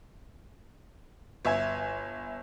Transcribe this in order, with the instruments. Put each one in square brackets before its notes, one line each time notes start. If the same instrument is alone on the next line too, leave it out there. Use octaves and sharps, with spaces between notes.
[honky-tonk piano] G1 E5 G#5 G#6